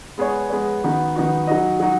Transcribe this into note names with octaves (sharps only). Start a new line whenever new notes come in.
G#3 B3 G#4 C#5
G#3 B3 G#4 C#5
D#3 B3 D#4 F#4
D#3 B3 D#4 F#4
F#3 D#4 F#4 D#5
F#3 D#4 F#4